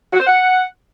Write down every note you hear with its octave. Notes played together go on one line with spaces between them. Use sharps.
F#4
C5
F#5